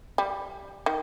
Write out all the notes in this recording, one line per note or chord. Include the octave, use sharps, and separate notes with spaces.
G3
D#3